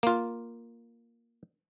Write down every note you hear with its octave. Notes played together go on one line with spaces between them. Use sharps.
A#3 F4